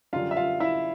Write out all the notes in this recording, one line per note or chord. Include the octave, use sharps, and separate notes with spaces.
F#2 D3 G3 F4 F5
E5
F4 F5
E4 E5